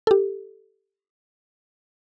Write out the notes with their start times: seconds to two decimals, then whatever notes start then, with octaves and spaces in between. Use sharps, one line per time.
0.07 G4 A4